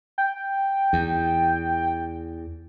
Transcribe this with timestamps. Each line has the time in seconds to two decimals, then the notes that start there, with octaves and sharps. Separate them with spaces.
0.18 G5
0.93 E2